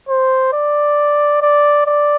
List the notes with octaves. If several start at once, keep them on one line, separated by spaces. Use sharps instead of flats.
C5
D5
D5
D5